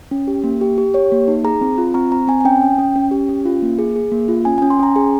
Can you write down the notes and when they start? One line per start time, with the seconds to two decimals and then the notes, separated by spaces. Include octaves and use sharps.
0.11 C#4
0.28 G4
0.44 A#3
0.61 G4
0.78 G4
0.94 G4 C#5
1.12 A#3
1.28 D#4
1.44 G#4 A#5
1.61 C4
1.78 F4
1.94 C4 A#5
2.12 C4 A#5
2.28 C4 G#5
2.41 G#5
2.45 C#4 G5
2.62 C#4
2.78 C#4
2.96 C#4
3.11 G4
3.29 C#4
3.45 F4
3.62 A#3
3.79 G#4
3.96 G#4
4.12 A#3
4.28 F4
4.45 C#4 G#5
4.58 G#5
4.62 C#4
4.70 C6
4.79 C#4 A#5
4.96 G#4 G#5